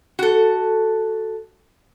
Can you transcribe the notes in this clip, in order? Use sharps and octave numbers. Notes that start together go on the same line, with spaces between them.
F#4 A4